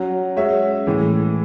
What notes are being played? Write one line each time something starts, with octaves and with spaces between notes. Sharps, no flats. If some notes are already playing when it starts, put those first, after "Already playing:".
Already playing: F#3 C#4 F#4
G#3 C#4 F#4 C#5 E5
A2 E3 G#3